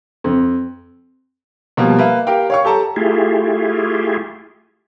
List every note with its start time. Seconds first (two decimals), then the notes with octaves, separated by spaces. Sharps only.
0.24 F2
1.77 B2 F3 G3 A#3
1.99 A#3 B4 E5
2.27 G4 A#4 F5 G5
2.50 C#5 F5 C#6
2.65 G4 A4 A5 A#5
2.96 A3 E4 F4 G4 G#4